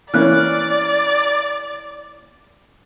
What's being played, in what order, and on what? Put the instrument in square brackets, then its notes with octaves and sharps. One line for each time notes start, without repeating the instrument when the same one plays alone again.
[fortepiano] E3 A#3 C#4 [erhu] D5 [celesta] F6 F#6